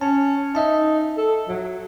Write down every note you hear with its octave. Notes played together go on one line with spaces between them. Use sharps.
C#4 A5
D#4 D#5 E5 A5
A4
F#3